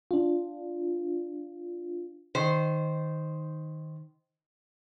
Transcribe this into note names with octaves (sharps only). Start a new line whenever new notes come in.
D4 F4
D#3 C5